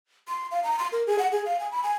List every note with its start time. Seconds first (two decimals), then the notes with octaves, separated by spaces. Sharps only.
0.28 C6
0.51 F5
0.64 A#5
0.79 C6
0.92 A#4
1.07 G#4
1.19 F#5
1.32 G#4
1.46 F5
1.60 G#5
1.72 B5
1.83 G#5